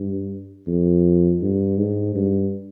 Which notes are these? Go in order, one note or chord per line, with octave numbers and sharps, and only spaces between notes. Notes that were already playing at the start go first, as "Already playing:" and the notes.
Already playing: G2
F2
G2
G#2
G2